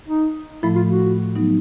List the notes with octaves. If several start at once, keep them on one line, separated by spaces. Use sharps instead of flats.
D#4
A2 F3 A3 E4
F4
F#4
F#3 B3 D#4